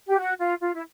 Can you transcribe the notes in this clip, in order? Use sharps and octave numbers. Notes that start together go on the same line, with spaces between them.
G4
F#4
F4
F4
E4